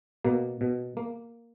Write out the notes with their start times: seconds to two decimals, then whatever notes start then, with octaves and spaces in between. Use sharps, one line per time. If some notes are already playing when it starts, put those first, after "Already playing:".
0.24 B2 A#3
0.61 B2
0.97 A#3